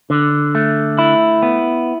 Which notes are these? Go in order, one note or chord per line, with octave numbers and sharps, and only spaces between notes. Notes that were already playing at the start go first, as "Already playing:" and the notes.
D3
A3
E4
B3